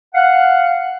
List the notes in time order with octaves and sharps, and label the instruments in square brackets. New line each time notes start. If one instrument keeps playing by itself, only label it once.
[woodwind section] F5 F#5